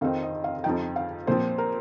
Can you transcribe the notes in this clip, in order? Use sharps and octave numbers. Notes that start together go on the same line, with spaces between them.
F2 D#3 C4 D#4 F5
D#5
F5
F2 F3 D#4 G5
F5
A#2 F3 C4 C5
A#4